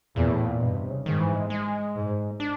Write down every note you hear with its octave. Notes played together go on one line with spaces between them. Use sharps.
E2 A#2
A2
A#2
G2 B2
C3
C#3
G#2 D#3
E3
G#3
G#3
G#2
D4